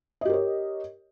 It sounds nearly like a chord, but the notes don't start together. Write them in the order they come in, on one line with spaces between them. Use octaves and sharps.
D#5 G4 A#4 C#5